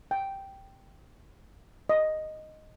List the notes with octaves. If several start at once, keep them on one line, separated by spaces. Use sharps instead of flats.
G5
D#5